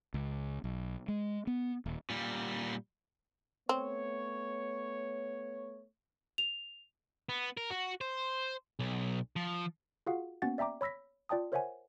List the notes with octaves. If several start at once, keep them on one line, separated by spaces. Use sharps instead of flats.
C#2
B1
G#3
B3
D#1
A#2 G3
A3 B3 C4 C#5
F7
B3
A#4
F#4
C5
B1
F3
F4 F#4 G#4 F5 F#5
A#3 B3 C#4 F#4 F#5 A6
D5 E5 G5 A#5 D6
C#5 B5 E6 A#6 B6
F4 D5 G5 A5 D#6
A#4 C5 C#5 E5 F#5 G#5